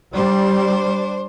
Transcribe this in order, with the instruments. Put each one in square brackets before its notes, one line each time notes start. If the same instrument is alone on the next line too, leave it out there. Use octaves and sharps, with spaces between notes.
[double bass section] G3 [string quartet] D4 C5